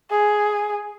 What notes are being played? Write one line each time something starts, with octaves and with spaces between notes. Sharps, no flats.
G#4